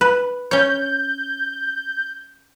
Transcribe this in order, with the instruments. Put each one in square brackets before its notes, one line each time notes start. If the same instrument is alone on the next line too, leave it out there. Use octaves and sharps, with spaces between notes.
[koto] B4
[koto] C#4 C#5 [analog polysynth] G6